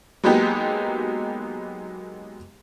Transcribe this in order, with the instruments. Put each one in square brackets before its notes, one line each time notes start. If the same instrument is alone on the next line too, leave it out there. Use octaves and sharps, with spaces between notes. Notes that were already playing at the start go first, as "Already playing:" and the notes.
[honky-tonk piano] F#3 G#3 A#3 B3 D#4 G4